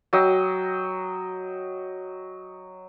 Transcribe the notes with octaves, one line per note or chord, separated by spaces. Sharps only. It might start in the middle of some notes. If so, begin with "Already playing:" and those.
F#3 D#5 G5